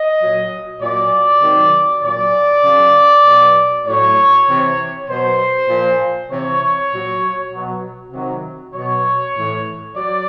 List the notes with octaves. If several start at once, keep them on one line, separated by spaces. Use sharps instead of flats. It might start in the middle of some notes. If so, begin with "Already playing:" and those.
Already playing: D#5
A#2 F#3
A#2 F#3 D5
C3 D#3 F#3
A#2 F#3 D5
C#3 F#3
B2 F#3
A2 F#3 C#5
C3 E3
B2 F#3 C5
A#2 F3
C3 E3 C#5
A#2 F#3
B2 F#3
C3 D#3 F#3
B2 F#3 C#5
A2 E3
F#3 D5